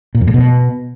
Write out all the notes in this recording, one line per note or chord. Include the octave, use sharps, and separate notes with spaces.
A#2
F2
A2
B2